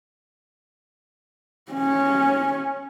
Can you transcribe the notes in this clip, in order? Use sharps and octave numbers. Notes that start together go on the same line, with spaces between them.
C#4